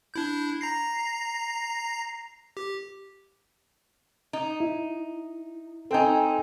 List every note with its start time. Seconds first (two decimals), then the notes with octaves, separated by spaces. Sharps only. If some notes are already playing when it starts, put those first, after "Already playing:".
0.14 D4 E4 G6
0.61 A#5 A#6 C7
2.57 G4
4.33 D#4
4.60 E4
5.91 C4 D#4 A4 G5 G#5